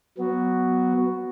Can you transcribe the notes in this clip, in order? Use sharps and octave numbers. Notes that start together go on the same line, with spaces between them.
F#3 B3 F#4